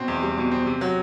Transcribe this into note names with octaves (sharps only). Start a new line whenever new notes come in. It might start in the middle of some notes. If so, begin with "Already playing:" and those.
Already playing: B2 C4
E2
G3
B2
C4
C3
F#3